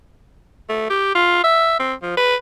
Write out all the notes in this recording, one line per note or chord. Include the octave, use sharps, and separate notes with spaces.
A3
G4
F4
E5
C4
F3
B4